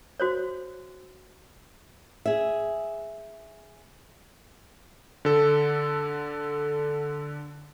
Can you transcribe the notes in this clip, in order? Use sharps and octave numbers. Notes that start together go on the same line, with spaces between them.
F#4 C5 C#5
G#4 E5
D3 A4